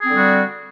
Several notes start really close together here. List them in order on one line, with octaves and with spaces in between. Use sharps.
G#4 C4 D3 G3 F#4